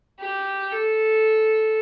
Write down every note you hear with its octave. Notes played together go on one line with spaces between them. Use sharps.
G4
A4